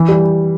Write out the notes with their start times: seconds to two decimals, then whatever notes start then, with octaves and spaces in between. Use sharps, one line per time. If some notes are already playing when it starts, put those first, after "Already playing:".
Already playing: E3
0.08 G3